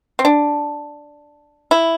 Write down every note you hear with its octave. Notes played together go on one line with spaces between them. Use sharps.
C4
D4
E4